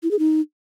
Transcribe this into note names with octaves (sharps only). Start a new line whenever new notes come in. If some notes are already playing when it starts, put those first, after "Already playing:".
E4
G#4
D#4